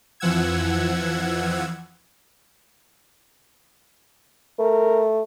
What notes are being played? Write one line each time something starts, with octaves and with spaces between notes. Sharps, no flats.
F2 E3 F3 F#5 E6 G#6
A3 A#4